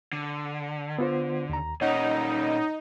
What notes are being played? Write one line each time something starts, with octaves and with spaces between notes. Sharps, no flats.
D3
B3 F4 C5
D#2 A#5
A#2 C#4 D#4 C#5 F#5